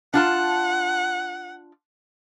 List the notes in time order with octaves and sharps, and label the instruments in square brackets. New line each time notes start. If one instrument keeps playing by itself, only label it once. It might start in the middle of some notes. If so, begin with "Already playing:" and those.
[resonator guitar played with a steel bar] D4 F4 A5 [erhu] F#5